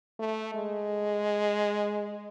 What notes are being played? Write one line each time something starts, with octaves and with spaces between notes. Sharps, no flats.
A3
G#3